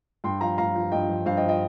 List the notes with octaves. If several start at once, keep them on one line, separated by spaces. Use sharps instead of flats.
G2 G5 C6
F3 F5 A#5
G2 F5 A#5
F3
G2 D#5 G5
F3
G2 C5 F5
D#5 G5
F3
D#5 G5